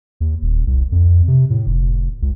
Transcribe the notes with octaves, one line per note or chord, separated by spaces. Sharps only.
D#2
D#1
C2
F2
C3
A2
F1
C#2